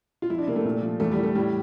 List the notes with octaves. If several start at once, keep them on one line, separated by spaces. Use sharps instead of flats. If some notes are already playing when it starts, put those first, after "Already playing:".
F4
F2 E4
D4
C3 A#3
A3
A#2
F3
E2 A3
G3
E3
A3
A2 G3